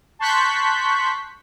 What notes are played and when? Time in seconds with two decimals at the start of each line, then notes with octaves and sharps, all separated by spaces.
0.19 A5 C6 C#6 F#6 G6 B6